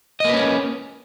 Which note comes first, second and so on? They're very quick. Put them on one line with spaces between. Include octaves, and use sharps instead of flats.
D#5 A#3 B4 C#4